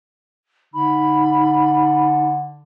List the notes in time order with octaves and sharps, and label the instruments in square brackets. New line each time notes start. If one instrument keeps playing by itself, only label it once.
[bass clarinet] D3 [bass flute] D#4 [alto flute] B5